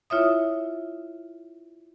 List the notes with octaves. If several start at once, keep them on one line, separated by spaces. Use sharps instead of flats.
E4 F4 C#5 E5 D#6